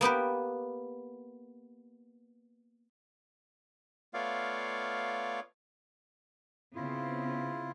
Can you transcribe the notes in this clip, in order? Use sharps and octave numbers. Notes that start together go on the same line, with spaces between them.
A#3 B3 G4 B4
A3 B3 F4 C#5 D5 F5
C#3 B3 C4 E4 F4